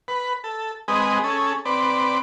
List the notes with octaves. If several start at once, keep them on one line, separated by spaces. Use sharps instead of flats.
B4
A4
G#3 C4 G#4 B4 D#5
C#4 G#4 A4
C4 B4 D5